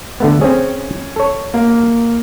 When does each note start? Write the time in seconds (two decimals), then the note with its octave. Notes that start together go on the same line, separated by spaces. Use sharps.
0.20 D3 A3 B3
0.41 C4 C#4 G#4
1.16 A4 C#5
1.54 A#3